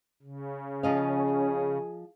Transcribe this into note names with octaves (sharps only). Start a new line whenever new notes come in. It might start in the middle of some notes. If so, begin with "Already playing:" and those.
C#3
F3 C#4 G#4 D#5 F5